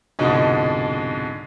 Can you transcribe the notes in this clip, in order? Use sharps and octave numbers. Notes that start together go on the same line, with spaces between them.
C2 F2 G#2 B2 D3 G#3